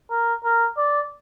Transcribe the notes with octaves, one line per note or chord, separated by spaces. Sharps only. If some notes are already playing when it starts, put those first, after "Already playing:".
A#4
A#4
D5